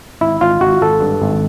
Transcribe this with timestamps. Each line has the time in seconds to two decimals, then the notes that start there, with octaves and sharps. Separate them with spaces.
0.21 G#1 E4
0.41 G#1 F4
0.61 G#1 F#4
0.82 G#1 A4
1.01 G2
1.22 G#1